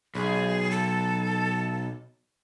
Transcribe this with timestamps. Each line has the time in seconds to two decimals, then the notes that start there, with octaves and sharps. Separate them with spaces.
0.15 B1 G#4
0.71 A4